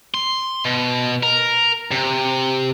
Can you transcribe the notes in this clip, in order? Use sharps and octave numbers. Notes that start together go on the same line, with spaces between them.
C6
B2
A#4
C3